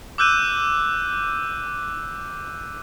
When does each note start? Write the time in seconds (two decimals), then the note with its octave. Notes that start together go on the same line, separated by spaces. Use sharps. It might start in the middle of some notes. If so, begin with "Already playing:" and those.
0.18 D6 E6 F#6 G6 D#7